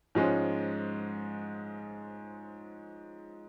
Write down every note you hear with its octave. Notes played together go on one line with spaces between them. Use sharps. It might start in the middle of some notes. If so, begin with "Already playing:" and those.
G#2 F3 G#3 C#4